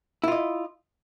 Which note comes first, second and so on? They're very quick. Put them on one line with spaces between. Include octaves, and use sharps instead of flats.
E4 F4 D#5